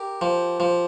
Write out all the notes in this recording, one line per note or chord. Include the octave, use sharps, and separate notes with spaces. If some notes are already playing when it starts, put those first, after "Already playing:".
Already playing: G4 A#4
F3
F3